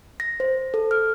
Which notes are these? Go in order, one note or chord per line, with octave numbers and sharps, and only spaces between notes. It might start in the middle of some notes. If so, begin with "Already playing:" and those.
A#6
C5
A4
F6